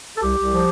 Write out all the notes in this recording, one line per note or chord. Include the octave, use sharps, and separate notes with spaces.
A4
C2 G4
C2
F3